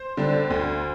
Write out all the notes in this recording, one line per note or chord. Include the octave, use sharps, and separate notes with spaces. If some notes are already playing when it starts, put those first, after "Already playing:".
Already playing: C5
D3 G3 D4
D2